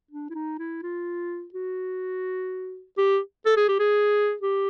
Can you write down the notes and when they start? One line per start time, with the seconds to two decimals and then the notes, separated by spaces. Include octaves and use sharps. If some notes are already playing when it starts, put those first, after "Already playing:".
0.11 D4
0.30 E4
0.35 D#4
0.59 E4
0.83 F4
1.54 F#4
2.98 G4
3.46 A4
3.57 G#4
3.69 G4
3.79 G#4
4.41 G4